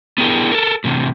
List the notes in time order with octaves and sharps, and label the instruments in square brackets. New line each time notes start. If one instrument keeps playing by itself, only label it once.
[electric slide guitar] B3 D4 E4 G4 G#4 A#4
A4 A#4
A2 C3 E3